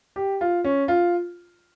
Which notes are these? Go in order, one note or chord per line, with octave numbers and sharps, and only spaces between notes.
G4
F4
C#4
F4